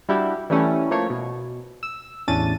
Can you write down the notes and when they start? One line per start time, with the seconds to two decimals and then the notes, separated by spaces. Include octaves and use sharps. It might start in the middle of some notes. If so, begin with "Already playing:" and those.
0.09 G3 D4 E4 F#4 G4
0.50 E3 G3 A3 C#4 E4
0.90 F3 A3 A#3 C#5
1.10 B2
1.83 E6
2.27 A1 E2 C#4 D4 A6 D#7